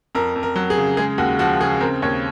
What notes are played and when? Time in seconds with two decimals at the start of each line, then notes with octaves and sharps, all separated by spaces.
0.15 F2 A#4
0.36 F2
0.43 A#4
0.56 F#3
0.70 G#4
0.78 C#3
0.97 G#3 G#4
1.18 D#2 F#4
1.39 F3 F#4
1.60 C#3 G#4
1.80 C4 A#4
2.02 D#2 C#5